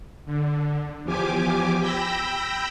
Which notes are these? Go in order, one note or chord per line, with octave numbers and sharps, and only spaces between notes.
D3
E2 F3 G4 G#5 D6
G5 B5 E6 G6 A#6